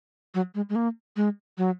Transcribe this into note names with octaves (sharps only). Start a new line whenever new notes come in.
F#3
G#3
G#3
A#3
G#3
F#3